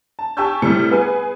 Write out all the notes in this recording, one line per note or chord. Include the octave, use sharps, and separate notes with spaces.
A5
G4 G#5 A5 C#6 E6 G6
A2 C3 G3 C#7
B3 G#4 B4 G#5